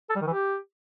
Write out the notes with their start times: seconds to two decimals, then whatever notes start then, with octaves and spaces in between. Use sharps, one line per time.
0.10 A4
0.16 G3
0.21 D#3
0.27 E3
0.33 G4